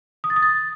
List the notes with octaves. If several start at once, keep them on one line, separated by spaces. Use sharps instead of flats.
D#6
A6
D#6
A6